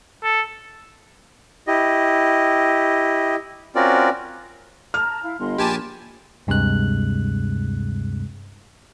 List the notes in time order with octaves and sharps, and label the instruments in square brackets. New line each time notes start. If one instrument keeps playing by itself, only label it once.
[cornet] A4
[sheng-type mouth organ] E4 G4 D#5
C4 C#4 F4 F#4 A#4 D5
[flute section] A5 A#5 [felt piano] F6
[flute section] E4 F5
[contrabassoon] G1 [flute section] D#5 B5 C6
[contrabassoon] A#1 [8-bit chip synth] G4 G#5 A5
[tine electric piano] D2 G2 C3 G#3 F#6